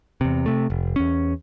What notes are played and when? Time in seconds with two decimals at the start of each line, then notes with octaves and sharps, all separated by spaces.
0.21 E2 C3
0.46 C3 A3
0.70 F1
0.96 E2 C#4